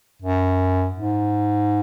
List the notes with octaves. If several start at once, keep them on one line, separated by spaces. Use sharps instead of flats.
F#2
G#2